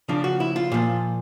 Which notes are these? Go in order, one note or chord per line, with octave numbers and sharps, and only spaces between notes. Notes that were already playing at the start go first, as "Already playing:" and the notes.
C#3 F3 D4
F#4
E4
F4
A#2 F3